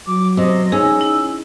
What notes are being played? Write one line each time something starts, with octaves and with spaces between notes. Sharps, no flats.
F#3 D6
C3 D#5
C#4 D#4 G#4 E6
E4